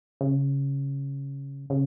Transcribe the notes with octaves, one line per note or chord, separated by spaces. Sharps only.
C#3
C#3